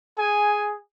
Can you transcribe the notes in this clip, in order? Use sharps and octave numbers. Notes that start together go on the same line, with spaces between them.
G#4 G#5